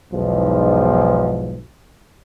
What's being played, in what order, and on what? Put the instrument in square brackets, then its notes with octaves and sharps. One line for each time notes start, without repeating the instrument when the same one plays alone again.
[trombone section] B1 E2 G#2 F3